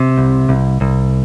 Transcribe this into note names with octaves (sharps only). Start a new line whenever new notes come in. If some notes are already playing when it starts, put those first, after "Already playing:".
Already playing: C3
C2
C2
C2